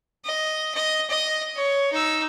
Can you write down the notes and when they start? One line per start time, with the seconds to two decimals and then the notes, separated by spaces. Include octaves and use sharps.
0.25 D#5
0.75 D#5
1.10 D#5
1.56 C#5
1.92 D#4 E6